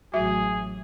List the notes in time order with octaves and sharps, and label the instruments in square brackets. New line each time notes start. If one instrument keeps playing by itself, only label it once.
[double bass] A1 F#3 [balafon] F#4 E5 [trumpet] G#4